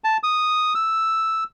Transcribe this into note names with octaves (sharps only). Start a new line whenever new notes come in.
A5
D#6
E6